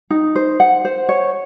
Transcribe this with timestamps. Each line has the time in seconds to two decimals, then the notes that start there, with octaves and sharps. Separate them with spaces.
0.10 D#4
0.35 C5
0.60 F#5
0.85 C5
1.09 C#5